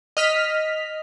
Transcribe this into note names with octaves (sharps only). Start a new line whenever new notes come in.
D#5 F6 B6